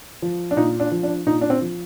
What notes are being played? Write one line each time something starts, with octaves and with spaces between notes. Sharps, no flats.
F3
D4
A#2 D#4
D4
F3
D4
A#2 D#4
D4
C4
F3